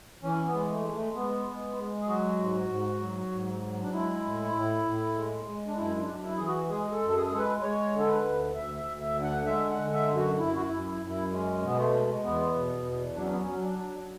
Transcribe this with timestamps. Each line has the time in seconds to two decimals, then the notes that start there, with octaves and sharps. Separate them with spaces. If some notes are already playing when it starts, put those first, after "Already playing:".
0.23 E3 C#4
0.46 B3
0.53 G#3
0.69 A3
0.84 G#3
0.92 A3
1.15 G#3 B3
1.47 G#3
1.77 G#3
2.01 G#4
2.08 F#3 F#4
2.39 G#2
2.69 G#2
3.00 F#3
3.32 G#2
3.62 F#3
3.83 D4
3.92 G#3 E4
4.24 A2
4.54 A2
4.85 A2
5.15 G#3
5.46 G#3
5.67 D4
5.77 F#2 E4
5.97 E4
6.00 D4
6.08 F#2
6.24 E4
6.37 E3 G#4
6.47 F#4
6.69 G#3 G#4
6.92 A4
7.01 F#2
7.10 A4
7.16 G#4
7.31 G#3 A4
7.38 B4
7.62 G#3 C#5
7.93 D3
7.99 A4
8.08 B4
8.23 D2
8.54 D2 E5
8.77 E5
8.85 D2
9.00 E5
9.16 D3
9.24 F#5
9.46 G#3 E5
9.70 F#5
9.77 D3
9.93 E5
10.08 F#2
10.16 F#4
10.38 F#2 E4
10.55 F#4
10.62 E4
10.70 F#2
10.86 E4
11.01 F#2
11.09 E4
11.31 G#3 C#4
11.62 B2 B3
11.77 A3
11.93 G#3
12.23 E2 B3
12.55 B2
12.86 E2
13.16 F#3 D4
13.23 C#4
13.29 B3
13.37 C#4
13.46 F#3
13.62 D4
13.78 F#3